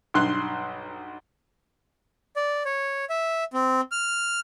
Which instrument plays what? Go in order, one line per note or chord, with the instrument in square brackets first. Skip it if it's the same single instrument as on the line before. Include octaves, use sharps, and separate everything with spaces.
[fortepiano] B1 G2 C6 F#6
[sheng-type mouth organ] D5
C#5
E5
C4
F6